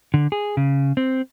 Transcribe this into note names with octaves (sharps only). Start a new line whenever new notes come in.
D3
G#4
C#3
C4